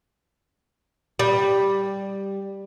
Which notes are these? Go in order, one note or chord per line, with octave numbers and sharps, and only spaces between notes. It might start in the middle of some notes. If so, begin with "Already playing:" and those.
G3